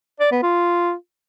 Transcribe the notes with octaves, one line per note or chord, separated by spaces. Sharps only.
D5
B3
F4